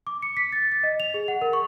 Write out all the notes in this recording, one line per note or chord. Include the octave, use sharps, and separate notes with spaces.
D6
C#7
B6
A6
A6
D#5
F7
G#4
F#5
A#4
C#6